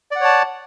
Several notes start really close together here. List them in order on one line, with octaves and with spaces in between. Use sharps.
D5 F#5 C#5 A5